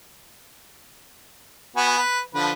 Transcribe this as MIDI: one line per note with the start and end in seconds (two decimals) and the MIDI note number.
1.76 1.97 59
1.76 1.97 66
1.76 1.97 80
1.98 2.20 71
2.34 2.52 50
2.34 2.52 53
2.34 2.52 71